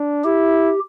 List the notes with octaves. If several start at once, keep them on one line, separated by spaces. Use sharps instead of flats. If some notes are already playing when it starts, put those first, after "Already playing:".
Already playing: D4
E4 G4